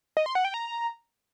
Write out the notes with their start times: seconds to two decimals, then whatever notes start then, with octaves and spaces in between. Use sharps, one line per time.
0.17 D#5
0.26 C6
0.35 F#5
0.45 G5
0.54 A#5